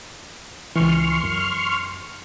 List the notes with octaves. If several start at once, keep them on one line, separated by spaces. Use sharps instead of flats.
C#2 E3 C6 C#6 F6
F#2